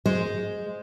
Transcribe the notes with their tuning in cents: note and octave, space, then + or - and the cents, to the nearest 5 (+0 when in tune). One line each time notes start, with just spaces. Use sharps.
G#3 +0 C5 -10